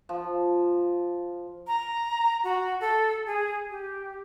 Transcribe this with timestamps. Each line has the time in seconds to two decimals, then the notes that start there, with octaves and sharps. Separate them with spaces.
0.09 F3
1.67 A#5
2.44 F#4
2.81 A4
3.26 G#4
3.70 G4